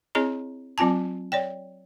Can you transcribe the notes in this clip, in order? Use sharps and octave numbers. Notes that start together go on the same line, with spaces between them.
C4 E4 G#4 C#5 D#5 A#5
F#3 C4 F4 G#5 A5
C#5 D5 G5